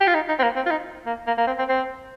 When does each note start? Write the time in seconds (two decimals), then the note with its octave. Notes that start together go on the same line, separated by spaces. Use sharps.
0.01 G4
0.07 F4
0.15 D#4
0.29 D#4
0.39 C4
0.43 A#3
0.56 C4
0.66 F4
0.71 D#4
1.06 A#3
1.27 A#3
1.38 A#3
1.47 C4
1.58 C4
1.69 C4